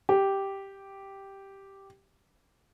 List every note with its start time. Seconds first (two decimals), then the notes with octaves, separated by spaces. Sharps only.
0.09 G4